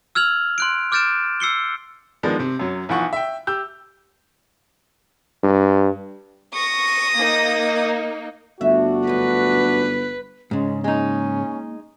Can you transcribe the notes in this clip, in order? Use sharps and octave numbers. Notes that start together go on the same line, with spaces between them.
E6 F6 G#6 F7 F#7
C6 F#6 D7
D6 F6 G6 A6 D7 E7
E6 C7 C#7 G7
D#3 F3 G#3 B3 D4
C3 C4
F#2 F#3
B1 E3 F3 F#5 C#6
E5 G5
G4 E6 G6
G2
C#6 D#6 A#6
A#3 D#4
G1 A3 D4 F#4 E5
F#2 D#4 B4
G#2 C#3 G#3 C#4
G#3 A#3 C#4 D#4